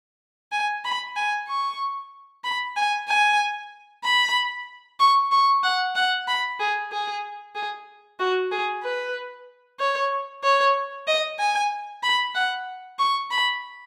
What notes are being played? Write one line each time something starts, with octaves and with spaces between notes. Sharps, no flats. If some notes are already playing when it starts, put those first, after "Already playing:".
G#5
B5
G#5
C#6
B5
G#5
G#5
B5
C#6
C#6
F#5
F#5
B5
G#4
G#4
G#4
F#4
G#4
B4
C#5
C#5
D#5
G#5
B5
F#5
C#6
B5